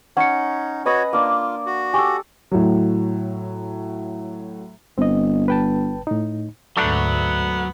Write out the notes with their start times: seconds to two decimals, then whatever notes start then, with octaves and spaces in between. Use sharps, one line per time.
0.17 C#4 D#4 F#5 C#6 C#7
0.86 F#4 B4 C#5 D#5 B5
1.13 A#3 D4 F4
1.66 F#4
1.93 G4 A4 G#5 C#6 D6
2.51 A2 F#3
4.98 G1 C4 D#5
5.48 B4 G5 A5
6.07 A2 D#4
6.77 D2 G#2 F#3 A3 B3 D4 F#5